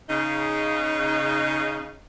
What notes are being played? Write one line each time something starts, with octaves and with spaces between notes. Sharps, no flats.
C#3 D#4